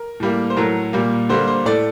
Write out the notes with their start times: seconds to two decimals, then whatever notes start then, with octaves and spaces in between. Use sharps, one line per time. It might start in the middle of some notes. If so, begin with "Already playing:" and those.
Already playing: A#4
0.20 A2 G3 A#3
0.50 C5
0.57 A2 F#3 A3 A#4
0.93 A#2 G3 A#3
1.29 D3 G3 A#3 C5
1.47 C5
1.66 A2 A3 D5